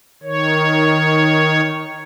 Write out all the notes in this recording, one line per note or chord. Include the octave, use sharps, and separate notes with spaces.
D#3 C#5